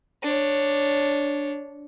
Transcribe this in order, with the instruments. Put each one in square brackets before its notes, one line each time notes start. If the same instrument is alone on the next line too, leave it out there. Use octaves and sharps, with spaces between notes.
[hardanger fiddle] D4 C#5